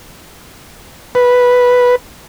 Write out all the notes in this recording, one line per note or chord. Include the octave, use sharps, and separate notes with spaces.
B4